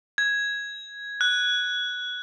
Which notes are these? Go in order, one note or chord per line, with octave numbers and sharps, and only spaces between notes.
G#6
F#6